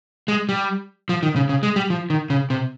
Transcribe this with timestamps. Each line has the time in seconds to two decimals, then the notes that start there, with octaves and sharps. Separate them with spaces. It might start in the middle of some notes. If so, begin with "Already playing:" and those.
0.28 G#3
0.49 G3
1.09 F3
1.23 D#3
1.36 C#3
1.49 C#3
1.63 G#3
1.76 G3
1.90 F3
2.10 D#3
2.30 C#3
2.50 C3